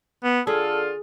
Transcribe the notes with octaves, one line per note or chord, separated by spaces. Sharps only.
B3
D3 F4 G#4 A4